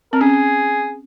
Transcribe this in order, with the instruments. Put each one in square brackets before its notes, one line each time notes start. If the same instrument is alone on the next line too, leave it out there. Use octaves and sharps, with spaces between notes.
[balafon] C4 [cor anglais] A#4
[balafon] C#4 [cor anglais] G#4